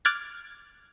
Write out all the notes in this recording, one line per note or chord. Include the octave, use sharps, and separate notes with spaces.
D6 F6 F#6 G#6 A6